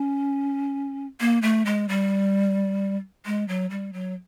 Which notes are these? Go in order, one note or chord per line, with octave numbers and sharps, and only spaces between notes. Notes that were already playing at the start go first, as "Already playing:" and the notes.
Already playing: C#4
A#3
A3
G#3
G3
G#3
F#3
G3
F#3